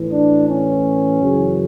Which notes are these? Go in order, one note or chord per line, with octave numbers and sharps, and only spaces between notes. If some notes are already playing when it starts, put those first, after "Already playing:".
Already playing: A2 E3
D4
C#4
F#2 C#3 E3